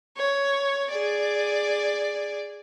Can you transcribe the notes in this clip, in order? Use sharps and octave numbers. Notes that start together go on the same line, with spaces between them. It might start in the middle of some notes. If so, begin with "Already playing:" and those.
C#5
G#4 D5